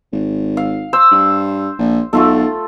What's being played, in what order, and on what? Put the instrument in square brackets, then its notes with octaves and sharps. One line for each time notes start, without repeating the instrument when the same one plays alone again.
[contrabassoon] G#1
[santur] F5
C5 E6
[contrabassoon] G2
A#1
[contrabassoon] B1 [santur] A3 F4 A4